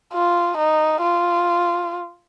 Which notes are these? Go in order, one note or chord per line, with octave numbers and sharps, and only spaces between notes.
F4
D#4
F4